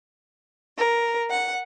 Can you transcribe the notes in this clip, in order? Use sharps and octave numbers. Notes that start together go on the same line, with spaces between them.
A#4
F#5